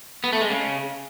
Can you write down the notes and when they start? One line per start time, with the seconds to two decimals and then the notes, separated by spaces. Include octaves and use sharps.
0.24 B3
0.33 A3
0.42 G#3
0.50 C#3